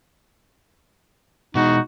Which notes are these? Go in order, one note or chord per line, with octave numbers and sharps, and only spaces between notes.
B2 G#3 D#4 F#4